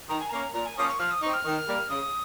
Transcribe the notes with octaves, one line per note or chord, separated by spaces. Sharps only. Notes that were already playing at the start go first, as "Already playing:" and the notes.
D#3 A#5
G#5
A#3 C#4 A#5
A#2 A#5
G#5
F3 A#3 C#4 D#6
C#6
F3 F6
D#6
C4 D#4 C#6
F6
D#3
G3 A#3
C#3 D#6